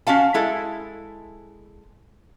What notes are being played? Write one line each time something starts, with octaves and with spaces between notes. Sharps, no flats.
C#4 F#4 F5 A5
G#3 E4 A4